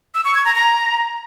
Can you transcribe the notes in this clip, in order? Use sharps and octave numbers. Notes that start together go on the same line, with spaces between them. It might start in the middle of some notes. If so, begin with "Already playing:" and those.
E6
C#6
G#6
A#5
A#5